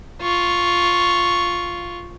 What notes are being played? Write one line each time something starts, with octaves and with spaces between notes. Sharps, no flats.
F4 C#6